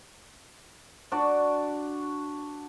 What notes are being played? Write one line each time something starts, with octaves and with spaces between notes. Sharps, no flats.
D4 F#4 D5